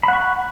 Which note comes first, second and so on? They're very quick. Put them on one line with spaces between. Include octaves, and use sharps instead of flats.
B5 F#5 C#6